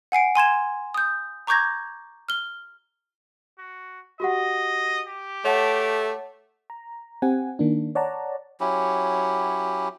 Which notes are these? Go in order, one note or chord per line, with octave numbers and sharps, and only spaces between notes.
F#5 G#5 C7 D7
G#5 C6 G#6 E7
D#6 G6
A#5 C#6 D6 G6 G#6 A#6
F6 G7
F#4
F#4 G4 D#5 F#5
G4
A3 C#5 F#5 A5
A#5
C4 G4 F#5 G#5
D#3 A#3 D4
C#5 D5 F#5 A5 A#5
F#3 C#4 E4 G4